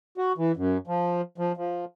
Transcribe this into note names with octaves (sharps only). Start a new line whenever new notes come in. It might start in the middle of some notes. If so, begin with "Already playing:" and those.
F#4
E3
F#2
F3
F3
F3